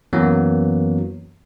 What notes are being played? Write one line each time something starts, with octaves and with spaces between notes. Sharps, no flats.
F#2 E3 F#3 A#3 B3